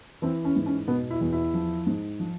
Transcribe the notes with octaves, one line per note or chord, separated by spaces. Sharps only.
E3 C4
C#4
G#2
C#4
B2 B3
E4
E2
E4
F3
G#2
F3